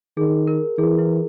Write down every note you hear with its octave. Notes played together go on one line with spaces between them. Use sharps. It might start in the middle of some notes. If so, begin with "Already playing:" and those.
D#3 G#4
A#4
E3 G#4
E4